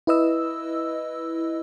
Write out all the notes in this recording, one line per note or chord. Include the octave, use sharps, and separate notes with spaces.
E4 B4 D#5 E6